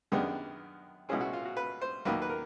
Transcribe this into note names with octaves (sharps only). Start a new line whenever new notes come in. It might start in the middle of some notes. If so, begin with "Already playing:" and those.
F#2 D#3 G#3 B3 D4 G4
C2 B2 G#3 C#4 E4 G#4
F#4
F4
F#4
B4
C5
D#2 D#3 F#3 A#3 B4
B4
A#4